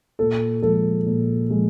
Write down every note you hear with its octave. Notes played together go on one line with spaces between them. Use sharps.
A#2 A4
F3 G#3 A4
A#2
F3 G#3